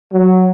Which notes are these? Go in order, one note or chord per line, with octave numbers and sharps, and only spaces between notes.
F#3